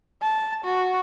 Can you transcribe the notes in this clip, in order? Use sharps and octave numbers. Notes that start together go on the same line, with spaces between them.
A5
F#4